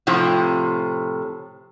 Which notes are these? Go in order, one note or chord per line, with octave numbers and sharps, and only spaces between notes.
A2 C3 F3